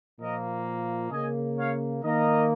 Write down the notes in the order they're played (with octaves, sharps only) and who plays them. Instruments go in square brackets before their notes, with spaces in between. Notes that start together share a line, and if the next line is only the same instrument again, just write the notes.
[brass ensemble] A#2 F3 A#3 A#4 D#5
C#3 A#3 D#5 G#5
C#5 F5
D#3 A#3 A#4 D#5